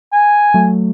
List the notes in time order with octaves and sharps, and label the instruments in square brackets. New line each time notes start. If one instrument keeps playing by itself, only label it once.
[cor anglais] G#5
[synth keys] F#3 A3